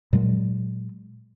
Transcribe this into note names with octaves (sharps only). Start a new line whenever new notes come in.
A#2 F#3 G#3